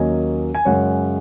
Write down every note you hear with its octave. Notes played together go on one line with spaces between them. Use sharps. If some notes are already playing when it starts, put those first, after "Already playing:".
Already playing: D#2 D#3 F#3 A#3 C#4 D#5 G#5
G#5
F#2 C#3 G#3 C#4 C#5 F#5